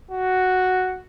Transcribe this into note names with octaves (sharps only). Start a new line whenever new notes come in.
F#4